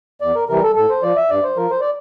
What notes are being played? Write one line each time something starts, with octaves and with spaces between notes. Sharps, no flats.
E2 D5
A#4
C3 E3 G3 A#4
A4
A2 A4
C5
F3 D5
E5
G2 D5
C5
F3 A#4
C5
D5